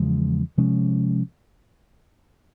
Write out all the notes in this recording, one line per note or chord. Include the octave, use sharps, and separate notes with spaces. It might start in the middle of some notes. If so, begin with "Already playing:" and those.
Already playing: E2 C#3 F3 G#3
C3 F3 G#3 C#4